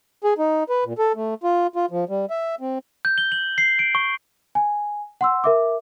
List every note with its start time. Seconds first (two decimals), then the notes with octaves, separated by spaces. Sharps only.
0.24 G#4
0.38 D#4
0.70 B4
0.85 A#2
0.99 A4
1.15 A3
1.44 F4
1.76 F4
1.91 F3
2.09 G3
2.30 E5
2.61 C4
3.05 G6
3.18 G7
3.32 F#7
3.58 C7
3.79 D7
3.95 C#6
4.55 G#5
5.21 F#5 C6 E6
5.44 A#4 E5 D6